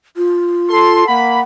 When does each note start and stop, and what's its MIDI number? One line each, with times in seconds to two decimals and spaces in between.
0.17 1.04 65
0.69 1.06 69
0.69 1.06 84
1.07 1.40 58
1.07 1.42 78
1.07 1.40 83